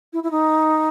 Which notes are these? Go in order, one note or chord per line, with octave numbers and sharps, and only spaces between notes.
E4
E4
D#4